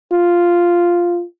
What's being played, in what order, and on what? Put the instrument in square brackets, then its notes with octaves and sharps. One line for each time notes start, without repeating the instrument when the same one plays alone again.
[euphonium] F4